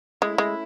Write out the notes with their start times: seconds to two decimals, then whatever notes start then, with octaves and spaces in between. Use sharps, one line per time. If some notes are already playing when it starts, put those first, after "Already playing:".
0.22 G#3 A3 C#4 E4
0.38 G#3